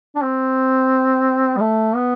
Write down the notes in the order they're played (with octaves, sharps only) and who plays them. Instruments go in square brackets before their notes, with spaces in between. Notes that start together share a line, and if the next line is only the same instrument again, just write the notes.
[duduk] D4
C4
G3
A3
B3